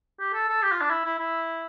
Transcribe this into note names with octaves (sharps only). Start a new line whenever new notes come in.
G4
A4
A4
G4
F4
D4
E4
E4
E4